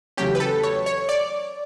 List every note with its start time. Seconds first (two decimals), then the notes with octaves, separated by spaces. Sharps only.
0.17 E2 C#3 F#3 A3 C#4 G4
0.35 B4
0.40 A4
0.63 C#5
0.86 C#5
1.09 D5